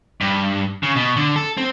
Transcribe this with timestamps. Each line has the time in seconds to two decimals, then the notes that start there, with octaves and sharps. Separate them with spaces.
0.21 G2
0.83 C#3
0.96 B2
1.16 D3
1.36 A4
1.57 C4